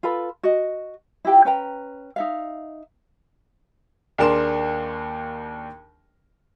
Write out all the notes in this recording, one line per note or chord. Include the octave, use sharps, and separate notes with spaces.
F4 A4 B4 B5
F#4 D#5
E4 F4 G4 G5
C#4 B4 G5 A#5
D#4 E5 F5
D#2 D4 G#4 A#4 C6 E7